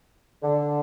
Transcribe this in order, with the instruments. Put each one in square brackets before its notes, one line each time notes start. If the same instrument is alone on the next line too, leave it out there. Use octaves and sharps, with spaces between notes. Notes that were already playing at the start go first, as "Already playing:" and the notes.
[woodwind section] D3